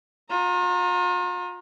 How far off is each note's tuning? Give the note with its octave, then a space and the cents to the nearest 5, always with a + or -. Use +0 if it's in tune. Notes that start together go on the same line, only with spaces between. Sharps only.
F4 +40 A#5 +0